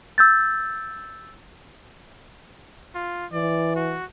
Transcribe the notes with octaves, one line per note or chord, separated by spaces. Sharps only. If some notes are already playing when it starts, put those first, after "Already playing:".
E6 G6 A6
F4
E3 D5
F#4